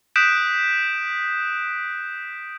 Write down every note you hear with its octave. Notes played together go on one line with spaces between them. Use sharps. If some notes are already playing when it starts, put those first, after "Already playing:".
D#6 F#6 G6 B6 D7 E7